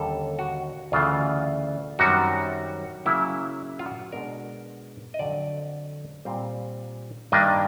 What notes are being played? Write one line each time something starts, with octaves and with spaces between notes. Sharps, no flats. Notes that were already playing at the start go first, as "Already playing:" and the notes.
Already playing: D#2 D3 G3 A#3 C#4 A4
F#4
D2 C#3 E3 F4
F#2 D#3 G3 C4 F#4
C#3 F#3 A#3 E4
F4
F#4
B2 G#3 B3 D4 A#4
D#5
F2 D3 F#3 D5
A#2 G3 C4
G2 D#3 G3 A#3 D4 D#5